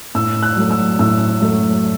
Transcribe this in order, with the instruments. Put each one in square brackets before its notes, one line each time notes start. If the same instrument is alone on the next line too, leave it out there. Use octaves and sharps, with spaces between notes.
[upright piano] A2 E6
F#6
F#3 A3
E6
A2 E6
F#3 A3